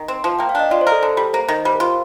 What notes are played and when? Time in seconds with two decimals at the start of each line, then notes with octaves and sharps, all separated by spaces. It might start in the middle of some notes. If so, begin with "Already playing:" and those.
Already playing: D#3
0.08 C4
0.24 F3
0.39 A#3 G5
0.49 F5
0.55 D4 D#5
0.71 F4 D5
0.81 C5
0.87 A#4
0.92 A4
1.03 D3
1.17 G3
1.33 A#3 C5
1.48 D#3
1.65 G3 C5
1.75 A#4
1.80 F4